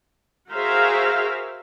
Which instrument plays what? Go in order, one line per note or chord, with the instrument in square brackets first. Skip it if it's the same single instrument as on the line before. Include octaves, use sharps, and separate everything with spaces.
[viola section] F#4 G#4 A#4 C5 E5 F5